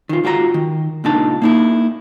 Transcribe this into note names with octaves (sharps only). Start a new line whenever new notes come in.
D#3 F4
G#2 F4 F#4 C#5 A#5
D#3
C#2 A#2 D4 D#4 A5
A#3 D#4 E4